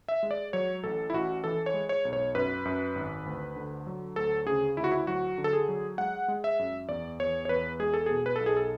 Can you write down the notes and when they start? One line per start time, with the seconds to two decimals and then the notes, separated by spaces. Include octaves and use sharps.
0.08 E5
0.23 G#3
0.31 D5
0.53 F#3 C#5
0.84 A1 A4
1.10 E4
1.13 A1 F#4
1.44 E3 A4
1.66 C#5
1.74 G#3
1.89 C#5
2.05 B1
2.13 C#5
2.35 F#2 B4
2.65 F#2
2.95 G#1
3.26 D2
3.56 D3
3.87 F#3
4.16 D2 A4
4.46 C#3 G#4
4.77 D2 E4
4.84 F#4
4.91 E4
5.07 F#3 F#4
5.38 D3
5.44 A4
5.53 G#4
5.68 F#3
5.98 G#3 F#5
6.28 G#3
6.44 E5
6.59 F#2
6.89 E2 D5
7.19 E2 C#5
7.45 C#5
7.49 E2 B4
7.79 G#3 G#4
7.94 A4
8.06 B2 G#4
8.26 B4
8.36 B1 A4
8.46 G#4
8.57 A4